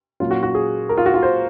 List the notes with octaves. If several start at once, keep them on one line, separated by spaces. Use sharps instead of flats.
A#2 F#3 C#4 F4
F#4
F#4
G#4
A#4
F4
F#4
F4
C5